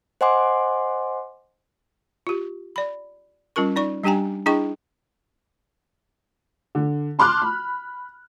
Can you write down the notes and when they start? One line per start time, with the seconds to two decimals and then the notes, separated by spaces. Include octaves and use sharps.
0.21 C5 D#5 F#5 G#5 C6 D6
2.27 F4 G4
2.76 D5 B5
3.56 G3 C#4 F4 A#4 C#6
3.76 D#4 D5 C#6
4.04 G3 D4 G4 G5 G#5 A#5
4.46 D4 E4 G#4 D#5 G5 C#6
6.75 D3
7.19 A5 C6 D6 F6 F#6
7.42 B5